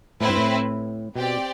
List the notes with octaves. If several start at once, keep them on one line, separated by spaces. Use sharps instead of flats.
A2 C4 E4 B4
G2
A2
B2 C4 G4 D5 G5